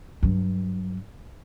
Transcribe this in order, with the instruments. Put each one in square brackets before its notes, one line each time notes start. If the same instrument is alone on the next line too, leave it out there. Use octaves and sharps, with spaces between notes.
[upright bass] G2 F#3